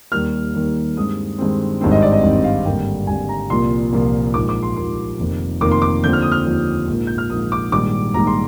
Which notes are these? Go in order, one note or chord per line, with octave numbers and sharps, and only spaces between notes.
D#2 D#3 G3 A#3 F6
D#2 D#3 G3 A#3
G2 D#3 G#3 C4 D#6
G2 D#3 G#3 C4
G#1 G2 D#3 G#3 C4
D#5
D5
D#5
G#1 G2 D#3 G#3 C4
F5
G#1 G2 D3 G3 A#3 G5
G#1 G2 D3 G3 A#3 G#5
A#5
C2 A#2 F3 A#3 C6
C2 A#2 F3 A#3
A#1 G#2 F3 A#3 D6
D6
C6
A#1 G#2 F3 A#3 C6
F1 F2 D#3 A#3
F1 F2 D#3 A#3 D6
C6
D6
D#2 D3 F3 C4 G6
F6
D#6
F6
D#2 D3 F3 C4
A#1 G#2 F3 A#3
G6
F6
A#1 G#2 F3 A#3 D#6
D6
A#1 G#2 D#3 G3 D6
A#1 G#2 D#3 G3 A#5
C6